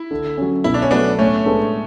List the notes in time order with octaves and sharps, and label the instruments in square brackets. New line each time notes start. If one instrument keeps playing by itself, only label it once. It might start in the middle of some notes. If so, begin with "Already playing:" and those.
Already playing: [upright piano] E4
[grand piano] D3
F#3 C#4
[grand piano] B2 [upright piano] E4
[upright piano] D4
C#4
[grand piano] F#3 A3 [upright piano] B3 D4
[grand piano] A2 [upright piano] A3 C#4
[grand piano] G#3 B3 D4 A4